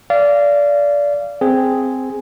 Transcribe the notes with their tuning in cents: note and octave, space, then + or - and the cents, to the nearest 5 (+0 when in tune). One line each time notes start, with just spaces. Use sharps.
D5 -20 F5 -25
C4 -10 G#4 +0